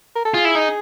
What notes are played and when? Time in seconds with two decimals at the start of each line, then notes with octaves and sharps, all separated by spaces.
0.16 A#4
0.25 A4
0.34 F4 G#4
0.45 E4
0.55 D#4